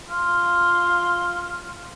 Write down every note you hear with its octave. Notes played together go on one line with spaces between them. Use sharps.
F4